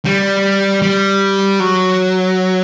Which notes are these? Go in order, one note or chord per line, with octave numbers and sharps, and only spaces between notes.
G3
G3
F#3